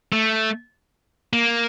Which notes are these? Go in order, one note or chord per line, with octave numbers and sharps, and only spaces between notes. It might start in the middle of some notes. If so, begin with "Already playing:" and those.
A3
A#3